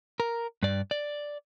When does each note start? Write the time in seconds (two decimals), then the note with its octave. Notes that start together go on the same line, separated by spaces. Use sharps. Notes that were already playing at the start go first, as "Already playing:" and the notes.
0.20 A#4
0.63 G2 D5
0.91 D5